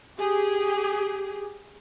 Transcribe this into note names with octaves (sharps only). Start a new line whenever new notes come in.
G4 G#4